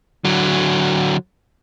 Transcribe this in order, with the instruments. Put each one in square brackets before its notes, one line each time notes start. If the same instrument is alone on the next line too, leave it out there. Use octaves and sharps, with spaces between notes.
[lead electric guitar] D3 F#3